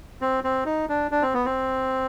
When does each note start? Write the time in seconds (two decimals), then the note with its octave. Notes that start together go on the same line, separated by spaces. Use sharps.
0.21 C4
0.44 C4
0.66 D#4
0.89 D4
1.11 D4
1.22 C4
1.34 B3
1.45 C4